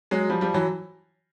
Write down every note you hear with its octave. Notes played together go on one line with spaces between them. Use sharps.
F#3 G#3
F3 G3
F3 G3
E3 F#3